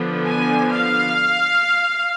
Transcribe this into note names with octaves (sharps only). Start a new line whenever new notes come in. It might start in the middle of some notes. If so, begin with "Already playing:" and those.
Already playing: D3 F3 B3 D4
G#5
F5